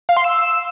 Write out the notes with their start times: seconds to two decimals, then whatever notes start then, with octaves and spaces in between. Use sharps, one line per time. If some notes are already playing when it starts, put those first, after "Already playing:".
0.09 F5
0.17 C6
0.24 E6